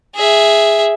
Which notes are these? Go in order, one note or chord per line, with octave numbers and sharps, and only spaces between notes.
G#4 E5